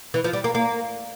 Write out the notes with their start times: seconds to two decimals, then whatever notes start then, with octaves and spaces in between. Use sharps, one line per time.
0.14 E3
0.24 F3
0.33 G3
0.44 A#3
0.55 A#3